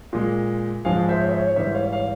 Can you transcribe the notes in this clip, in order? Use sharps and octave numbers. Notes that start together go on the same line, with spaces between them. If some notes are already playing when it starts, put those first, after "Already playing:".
A#2 G#3
G#2 F3 G#3 F5 G#5
C5 E5
C#5
C5 E5
C#5
C#5
G#2 E3 G3 C5 E5
C#5 F5
C#5 F5